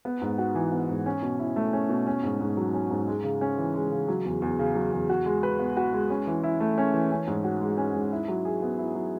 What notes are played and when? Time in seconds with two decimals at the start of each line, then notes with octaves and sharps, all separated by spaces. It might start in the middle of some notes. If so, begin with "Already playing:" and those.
0.05 B3
0.22 G#2
0.38 F#4
0.55 E3
0.72 B3
0.89 G#2
1.06 C#4
1.22 B2
1.39 E4
1.56 A3
1.73 C#4
1.89 B2
2.06 C#4
2.23 G#2
2.40 G#2
2.57 F#3
2.74 C#4
2.91 G#2
3.08 G#3
3.24 C#3
3.41 C#4
3.58 E3
3.74 G#3
3.92 C#3
4.08 F#3
4.25 E2
4.42 E2
4.59 C#3
4.75 F#3
4.92 E2
5.10 F#4
5.26 G#3
5.43 B4
5.59 B3
5.77 F#4
5.93 G#3
6.10 C#4
6.27 E3
6.43 E4
6.60 A3
6.78 C#4
6.94 E3
7.11 C#4
7.27 G#2
7.44 F#4
7.61 G#3
7.78 C#4
7.95 G#2
8.12 E4
8.28 F#3
8.45 G#4
8.62 B3
8.79 E4
8.95 F#3